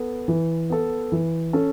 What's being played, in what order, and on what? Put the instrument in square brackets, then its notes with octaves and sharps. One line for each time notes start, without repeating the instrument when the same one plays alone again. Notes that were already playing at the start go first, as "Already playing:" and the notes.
Already playing: [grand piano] B3 A4
E3
B3 A4
E3
C#4 A4